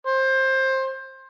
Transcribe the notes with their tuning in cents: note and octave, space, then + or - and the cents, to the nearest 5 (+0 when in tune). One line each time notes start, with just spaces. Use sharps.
C5 +20